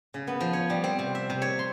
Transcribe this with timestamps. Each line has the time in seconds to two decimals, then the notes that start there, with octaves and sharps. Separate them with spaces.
0.14 C#3
0.27 B3
0.41 F3
0.53 C#5
0.70 G3
0.84 C4
0.99 C3
1.15 E5
1.30 C3
1.42 C#5
1.59 C6